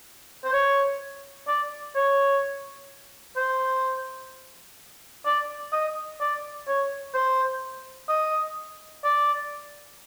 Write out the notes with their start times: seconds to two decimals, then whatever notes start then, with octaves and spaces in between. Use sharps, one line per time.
0.44 C5
0.53 C#5
1.48 D5
1.96 C#5
3.36 C5
5.26 D5
5.73 D#5
6.21 D5
6.68 C#5
7.14 C5
8.09 D#5
9.04 D5